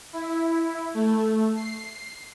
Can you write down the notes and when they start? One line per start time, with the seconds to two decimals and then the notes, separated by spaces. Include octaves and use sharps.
0.13 E4
0.94 A3
1.56 C7